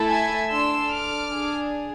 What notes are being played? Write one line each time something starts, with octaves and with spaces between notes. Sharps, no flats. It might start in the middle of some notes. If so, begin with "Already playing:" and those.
Already playing: A3 E4 A4
E5 G#5
D4 A4 C6 E6
D6 F6
D4 G#4